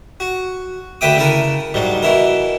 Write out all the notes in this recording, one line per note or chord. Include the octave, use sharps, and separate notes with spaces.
F#4
D2 B4 E5 G5 D6 D#6
C#3 E4 A4 A#4
G#2 F#3 G3
B2 E3 E4 A#4